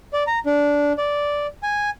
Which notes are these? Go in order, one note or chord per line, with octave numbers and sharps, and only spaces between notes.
D5
A#5
D4
D5
G#5